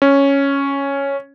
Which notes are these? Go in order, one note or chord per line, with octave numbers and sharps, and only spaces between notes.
C#4